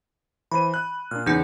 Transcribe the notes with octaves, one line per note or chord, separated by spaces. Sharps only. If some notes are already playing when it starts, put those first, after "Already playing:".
E3 C5 B5 D#7
F#6
A#2 D4 F6
E2 C#3 D#4 G6